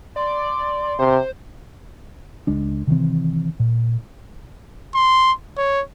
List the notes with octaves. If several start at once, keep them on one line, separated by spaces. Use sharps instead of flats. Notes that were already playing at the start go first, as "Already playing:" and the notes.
D5 C6
C3 C5
C#2 G#3 D4
C3 D#3 E3 C4
A#2
C6
C#5